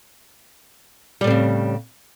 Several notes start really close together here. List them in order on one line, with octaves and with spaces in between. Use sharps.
G3 A2 C4 C#3